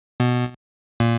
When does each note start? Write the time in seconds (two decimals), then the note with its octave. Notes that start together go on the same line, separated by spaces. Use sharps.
0.20 B2
1.00 A#2